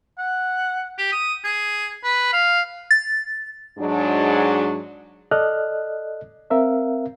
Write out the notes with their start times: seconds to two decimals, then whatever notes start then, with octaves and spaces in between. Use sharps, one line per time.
0.18 F#5
0.98 G4
1.12 D#6
1.44 G#4
2.04 B4
2.33 F5
2.91 A6
3.79 G#2 F#3 D4
5.31 A4 D5 D#5 F6 F#6
6.50 C4 A#4 E5 F5